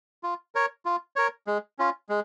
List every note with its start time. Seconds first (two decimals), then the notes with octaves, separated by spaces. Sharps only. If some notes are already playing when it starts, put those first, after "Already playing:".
0.23 F4
0.55 A#4 C#5
0.85 F4
1.16 A#4 C#5
1.47 G#3
1.79 C#4 F4
2.09 G#3